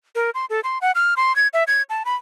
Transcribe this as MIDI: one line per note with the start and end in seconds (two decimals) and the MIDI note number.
0.15 0.30 70
0.35 0.46 84
0.50 0.60 69
0.64 0.78 84
0.81 0.92 78
0.95 1.14 89
1.17 1.35 84
1.36 1.48 92
1.53 1.64 76
1.68 1.82 92
1.90 2.03 81
2.05 2.15 83